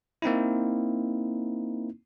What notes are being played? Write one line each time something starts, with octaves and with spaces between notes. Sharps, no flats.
A#3 C4 D#4 E4